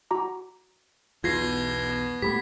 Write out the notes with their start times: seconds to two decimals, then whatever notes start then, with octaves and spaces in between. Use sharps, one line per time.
0.11 F#4 A#5 D6
1.24 B1 E2 B2 F4 G#6 A#6 C7
2.22 A#2 A3 B3 G4 B5 B6